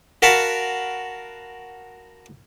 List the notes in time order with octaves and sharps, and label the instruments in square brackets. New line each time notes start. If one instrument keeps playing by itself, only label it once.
[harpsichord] F#4 A#4 F5 F#5 A5 B5